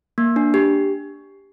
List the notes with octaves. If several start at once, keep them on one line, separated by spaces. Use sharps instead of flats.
A#3
D4
G4